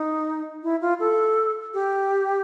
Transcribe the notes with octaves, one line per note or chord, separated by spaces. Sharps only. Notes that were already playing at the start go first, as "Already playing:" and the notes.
Already playing: D#4
E4
F4
A4
G4